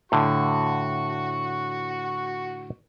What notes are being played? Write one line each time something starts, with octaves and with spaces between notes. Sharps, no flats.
A2 D3 F#4 C#6